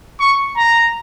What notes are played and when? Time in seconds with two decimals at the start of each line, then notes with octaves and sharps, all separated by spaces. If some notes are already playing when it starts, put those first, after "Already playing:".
0.20 C#6
0.57 A#5